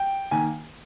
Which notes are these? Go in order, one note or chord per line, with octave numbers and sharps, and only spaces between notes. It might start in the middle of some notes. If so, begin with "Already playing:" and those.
Already playing: G5
D#3 A#3 G#5